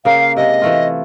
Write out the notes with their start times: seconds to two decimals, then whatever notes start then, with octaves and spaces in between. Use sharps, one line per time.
0.05 C#3 A#3 F5
0.37 C3 G#3 D#5
0.62 E3 A3 F4